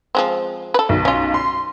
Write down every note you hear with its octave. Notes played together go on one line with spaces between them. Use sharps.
F3 G#3 C4
A4 B4
B1
C#4 F4
C6